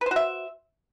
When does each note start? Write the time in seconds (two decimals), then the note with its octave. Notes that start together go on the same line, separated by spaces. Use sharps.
0.01 B4
0.06 C5
0.11 F#4
0.16 E5